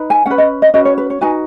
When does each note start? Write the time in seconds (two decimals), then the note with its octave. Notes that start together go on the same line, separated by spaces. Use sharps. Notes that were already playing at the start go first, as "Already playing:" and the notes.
Already playing: D#4 B4
0.10 G#5
0.26 C#4 B4 F#5
0.38 D#5
0.62 D#5
0.74 C#4 F#4 B4 D#5
0.85 C#5
0.98 B4
1.10 C#5
1.21 D#4 F#4 B4 G#5